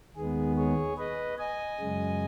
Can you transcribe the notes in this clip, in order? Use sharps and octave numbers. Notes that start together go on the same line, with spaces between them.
D#2 D#3 G#3 B3 G#4
G#4 C#5
B4 D#5
D#5 G#5
F#2 C#3 G#3